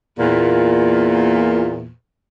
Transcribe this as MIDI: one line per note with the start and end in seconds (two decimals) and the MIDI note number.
0.19 1.91 40
0.19 1.91 46